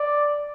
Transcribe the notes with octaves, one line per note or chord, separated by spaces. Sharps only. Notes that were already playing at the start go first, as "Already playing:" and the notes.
Already playing: D5